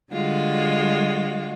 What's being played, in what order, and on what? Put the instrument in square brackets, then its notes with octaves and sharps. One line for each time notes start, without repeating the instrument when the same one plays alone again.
[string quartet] D3 G3 G#3 F4 F#4